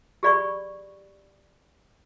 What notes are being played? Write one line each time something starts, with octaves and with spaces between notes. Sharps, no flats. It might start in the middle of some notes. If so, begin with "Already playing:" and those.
G4 G#4 D5 B5 C#6